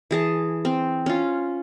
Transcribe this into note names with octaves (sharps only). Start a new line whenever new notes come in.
E3 G#4 A5
C4
C#4 F4